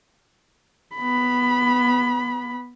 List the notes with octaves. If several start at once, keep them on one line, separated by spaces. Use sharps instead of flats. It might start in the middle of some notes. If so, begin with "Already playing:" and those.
B3 B5